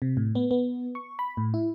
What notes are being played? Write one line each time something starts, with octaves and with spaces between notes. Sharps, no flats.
C3
A2
B3
B3
C#6
B5
A2
E4